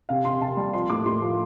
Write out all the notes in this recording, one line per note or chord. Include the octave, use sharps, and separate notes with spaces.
C3 F5
C3 C6
C3 A5
G3
F3 C6
A2 D6
A2 C6
F3